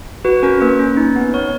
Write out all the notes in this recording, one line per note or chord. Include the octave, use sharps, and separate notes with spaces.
F#4 B4
C#4 A#4
A#3 B4
C#4
D#4
B3
B3 C#5